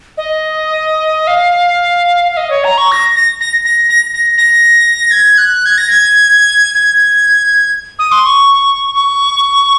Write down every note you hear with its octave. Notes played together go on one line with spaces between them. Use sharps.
D#5
F5
F5
D#5
C#5
A#5
C#6
A#6
A#6
A#6
A#6
A#6
A#6
A#6
G#6
F#6
G#6
A#6
G#6
G#6
D#6
C6
C#6
C#6